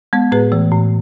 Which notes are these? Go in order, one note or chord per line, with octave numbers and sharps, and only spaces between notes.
G#3 B3
A2 G#4 B4
E3 A3
A2